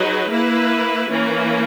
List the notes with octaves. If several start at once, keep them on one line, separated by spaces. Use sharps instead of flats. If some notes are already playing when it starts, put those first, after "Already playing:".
Already playing: F#3 D#4 G#4 B4
A#3 E4 B4
E3 A#3 C#4